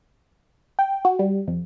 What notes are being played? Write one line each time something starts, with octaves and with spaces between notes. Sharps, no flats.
G5
F#4
G3
F2